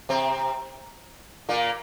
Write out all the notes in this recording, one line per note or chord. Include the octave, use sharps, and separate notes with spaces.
C3 C4
A#2 A#3